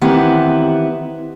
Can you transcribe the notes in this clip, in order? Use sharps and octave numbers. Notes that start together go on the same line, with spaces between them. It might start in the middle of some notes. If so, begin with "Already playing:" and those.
D#3 E3 B3 C4 E4 G4